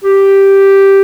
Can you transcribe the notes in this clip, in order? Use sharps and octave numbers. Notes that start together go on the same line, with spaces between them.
G4